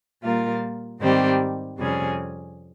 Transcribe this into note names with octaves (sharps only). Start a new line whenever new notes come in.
A#2 G3 A#3 F4 A#4
G#2 D#3 G3 C4 G4
F2 C3 G3 C#4 G#4